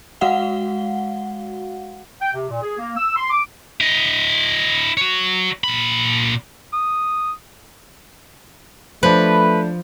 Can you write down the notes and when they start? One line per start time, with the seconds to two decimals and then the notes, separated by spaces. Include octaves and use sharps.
0.21 G#3 F#4 F5 F#5 G7
2.21 G5
2.34 C3
2.50 A#2
2.62 G#4
2.78 A#3
2.97 E6
3.16 C6
3.30 D6
3.81 E4 D#5
4.97 F#4 C#5
5.64 A#2 B5
6.73 D#6
9.03 F3 A3 D4 B4 C5